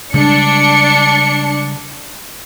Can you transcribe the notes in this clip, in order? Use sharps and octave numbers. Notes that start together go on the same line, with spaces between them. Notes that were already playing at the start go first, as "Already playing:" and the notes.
C#3 G3 G#3 D4 C#7